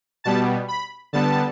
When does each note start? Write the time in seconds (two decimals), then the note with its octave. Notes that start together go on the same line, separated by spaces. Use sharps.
0.24 B2 G3 B3 A5
0.68 B5
1.13 D3 G3 B3 A5